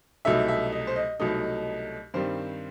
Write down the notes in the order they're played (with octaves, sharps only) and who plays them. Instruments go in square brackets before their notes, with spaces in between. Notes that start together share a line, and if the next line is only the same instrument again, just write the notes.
[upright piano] C2 B2 F#3 A3 D#4 E5
E5
D#5
C5
D#5
C2 B2 F#3 A3 D#4 D#5
G2 D#3 G3 C4 C5